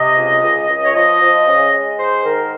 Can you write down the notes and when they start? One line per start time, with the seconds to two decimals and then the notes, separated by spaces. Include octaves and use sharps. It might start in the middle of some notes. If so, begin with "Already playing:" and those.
Already playing: C3 D#5
0.16 C#2
0.42 C#2
0.68 C#2
0.84 C#5
0.94 F3 D#5
1.21 F3
1.47 C#3
1.72 G#3
1.98 G#2 C5
2.24 D#3 A#4